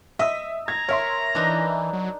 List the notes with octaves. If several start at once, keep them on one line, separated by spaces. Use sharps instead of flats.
D#5 E5 E6
A#5 G#6
A#4 C#5 E5 C6
E3 D4 D#4
F#3